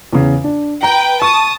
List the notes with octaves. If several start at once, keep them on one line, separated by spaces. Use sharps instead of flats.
E2 C#3
D4
B4 G5 A#5
A5 C#6 D#6